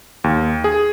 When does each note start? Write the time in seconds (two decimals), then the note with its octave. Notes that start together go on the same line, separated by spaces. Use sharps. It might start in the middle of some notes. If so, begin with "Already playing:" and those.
0.24 D#2
0.64 G#4